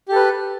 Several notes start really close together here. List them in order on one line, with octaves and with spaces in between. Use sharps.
G4 A4 B4